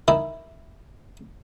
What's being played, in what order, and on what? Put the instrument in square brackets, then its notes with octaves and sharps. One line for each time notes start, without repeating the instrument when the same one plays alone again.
[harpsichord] D#3 E4